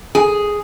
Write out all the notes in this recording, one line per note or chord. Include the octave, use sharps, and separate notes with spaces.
G#4